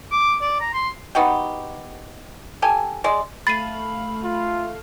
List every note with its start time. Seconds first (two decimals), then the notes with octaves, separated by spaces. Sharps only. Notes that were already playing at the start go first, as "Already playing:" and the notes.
0.12 D6
0.41 D5
0.61 A#5
0.74 C6
1.15 B3 D#4 F#4 G4
2.62 G4 A4 G#5
3.04 G#3 D5
3.47 A3 F5 B5 A6 C7 D#7
4.23 F4